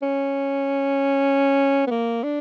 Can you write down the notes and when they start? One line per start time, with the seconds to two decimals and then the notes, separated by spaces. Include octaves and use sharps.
0.02 C#4
1.87 B3
1.90 A#3
2.23 D4